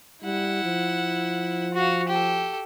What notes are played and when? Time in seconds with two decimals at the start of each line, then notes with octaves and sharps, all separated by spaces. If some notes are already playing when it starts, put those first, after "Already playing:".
0.23 G3 E4 F#5
0.64 F3
1.74 F#4 F5
2.08 G4 A4